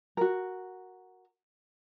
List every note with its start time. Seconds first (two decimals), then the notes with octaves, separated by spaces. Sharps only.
0.17 F#4 A#4